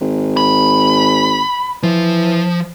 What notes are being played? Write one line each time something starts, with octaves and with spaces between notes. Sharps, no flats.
G#1
B5
E3 F3